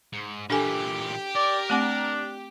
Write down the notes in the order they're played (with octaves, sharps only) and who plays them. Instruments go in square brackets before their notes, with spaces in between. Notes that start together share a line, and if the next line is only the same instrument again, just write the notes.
[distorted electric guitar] G#2
[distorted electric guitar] A#2 E3 [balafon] D4 A4 G#5 [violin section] G4
[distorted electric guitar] A#4 [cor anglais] D5
[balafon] A3 C4 F#5 [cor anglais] D4